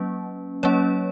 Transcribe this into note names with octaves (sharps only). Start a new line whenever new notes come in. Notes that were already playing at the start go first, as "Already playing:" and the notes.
Already playing: F#3 A#3 C#4
F#3 A#3 C#4 C#5